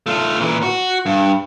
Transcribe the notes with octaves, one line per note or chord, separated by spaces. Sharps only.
A3 F4
A#2 E3
F#4
G2